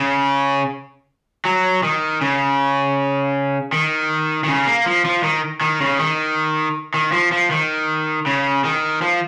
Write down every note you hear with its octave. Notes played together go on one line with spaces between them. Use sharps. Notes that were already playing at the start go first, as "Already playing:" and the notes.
Already playing: C#3
F#3
D#3
C#3
D#3
D#3
C#3
A#3
F3
F3
D#3
D#3
C#3
D#3
D#3
F3
F3
D#3
C#3
D#3
F3